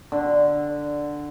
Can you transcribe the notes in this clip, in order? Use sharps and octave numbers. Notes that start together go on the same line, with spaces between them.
D3